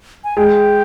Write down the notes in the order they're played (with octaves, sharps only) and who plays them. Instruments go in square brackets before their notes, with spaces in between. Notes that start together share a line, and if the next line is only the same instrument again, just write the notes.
[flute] G#5
[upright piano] G#3 [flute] G5